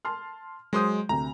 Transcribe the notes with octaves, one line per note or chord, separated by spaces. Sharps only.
A5 C6 F6
F#3 G#3 C5 C6 D#6 G6
D2 C3 A#5